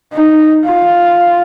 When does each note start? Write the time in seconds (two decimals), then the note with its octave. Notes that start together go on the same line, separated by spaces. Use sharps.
0.13 D#4
0.66 F4